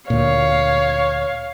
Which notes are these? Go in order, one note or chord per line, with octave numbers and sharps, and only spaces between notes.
D2 A#2 C#5 F5